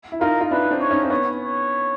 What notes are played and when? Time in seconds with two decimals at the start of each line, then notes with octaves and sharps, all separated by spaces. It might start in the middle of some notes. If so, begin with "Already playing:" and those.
0.12 E4
0.21 D#4 F4 A#4
0.41 F4
0.51 D4 E4 B4
0.64 D#4
0.71 C4 D4
0.81 C#5
0.91 C#4 D#4
1.03 C4
1.10 B3 C#4 C#5
1.41 C#5